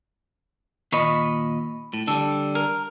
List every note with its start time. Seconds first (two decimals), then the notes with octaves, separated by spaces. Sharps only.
0.92 D#2 A#2 D#5 B5 C#6
1.94 A2
2.07 D3 G3 A4
2.55 A#4